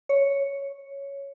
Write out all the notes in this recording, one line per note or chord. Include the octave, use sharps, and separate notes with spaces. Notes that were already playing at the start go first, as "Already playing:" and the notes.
C#5